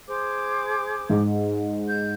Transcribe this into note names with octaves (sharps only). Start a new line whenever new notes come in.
G#4 C5 D6
G#2
G6